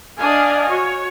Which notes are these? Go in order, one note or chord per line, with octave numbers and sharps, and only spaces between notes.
D4 D5 D#5 F5 G#5
F#4 C#5